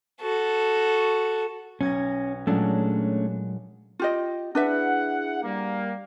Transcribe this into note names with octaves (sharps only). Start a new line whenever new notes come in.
F#4 A4
B1 C#4 G#6 A#6
A#2 F#3 G#3 A3 C#4 D4
F4 G4 D#5
D4 E4 G#4 B4 E5 F#5
G3 A#3